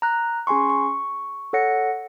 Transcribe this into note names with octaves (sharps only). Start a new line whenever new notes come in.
A#5 F#6
C#4 G#4 G#5 C6 C#6
C#6
A4 C#5 F#5 A#6 C#7